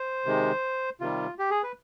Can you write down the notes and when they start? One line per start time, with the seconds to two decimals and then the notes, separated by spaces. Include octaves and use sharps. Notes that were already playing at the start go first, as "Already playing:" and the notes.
Already playing: C5
0.25 C3 D#3 G#3
1.00 C3 D#3 G3 F4
1.39 G4
1.51 G#4
1.63 B4